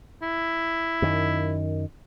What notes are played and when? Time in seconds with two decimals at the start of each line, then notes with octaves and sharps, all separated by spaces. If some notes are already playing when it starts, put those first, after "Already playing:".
0.22 E4
1.02 F#2 D#3